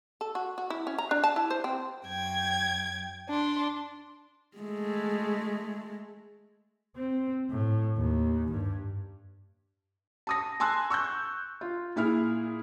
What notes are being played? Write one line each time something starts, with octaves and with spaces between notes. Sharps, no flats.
A4
F#4
F#4
E4
C#4
A#5
D4
A5
E4
C5
C4
F#2 G5 G#6
D4 C6
G#3 A3
C4
A2
D#2
G2
A5 D#6 A#6
G#5 A5 C6 E6 F#6
C#6 E6 F#6 G6
F4
A#2 E4 G#4 F6